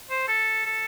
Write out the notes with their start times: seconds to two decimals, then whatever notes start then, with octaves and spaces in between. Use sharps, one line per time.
0.11 C5
0.28 A4
0.66 A4